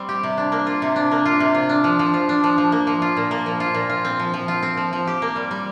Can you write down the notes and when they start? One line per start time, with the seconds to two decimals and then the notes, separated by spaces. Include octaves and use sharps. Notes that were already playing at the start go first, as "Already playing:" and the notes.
Already playing: G3 C4
0.09 G4
0.23 C3
0.37 D4
0.52 A#3
0.67 F4
0.82 C3
0.96 D4
1.11 A#3
1.26 F4
1.40 C3
1.54 F4
1.69 D4
1.84 F3
1.99 F3
2.14 F4
2.29 D4
2.44 F3
2.58 F3
2.72 A#3
2.87 F3
3.02 F4
3.17 A#2
3.31 A#3
3.46 F3
3.60 F4
3.74 A#2
3.89 F4
4.05 C4
4.19 F3
4.34 F3
4.48 F4
4.62 C4
4.77 F3
4.93 F3
5.07 G4
5.22 A#3
5.36 G3
5.51 G3